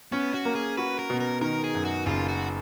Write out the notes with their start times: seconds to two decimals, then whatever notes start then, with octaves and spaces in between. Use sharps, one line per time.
0.12 B3 C#4
0.34 F#4
0.45 A#3
0.55 G#4
0.77 F#4 B4
0.99 A#4
1.10 B2
1.20 A#4
1.41 D#3 A#4
1.64 G#4
1.75 F#2
1.85 F#4
2.06 F#1 F4
2.28 F#4